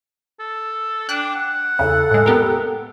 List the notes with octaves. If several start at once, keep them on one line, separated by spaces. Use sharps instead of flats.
A4
D4 G5 F#6
F#5
E2 C#3 A4
A2 G#3
B3 G4 A#4